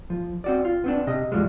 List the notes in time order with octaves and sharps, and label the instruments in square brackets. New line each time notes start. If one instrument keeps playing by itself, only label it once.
[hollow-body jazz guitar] F3
C4 F#4 D5
F4
B3 C4 D4
C3 D#5
E2 A2 F3 G3 G#3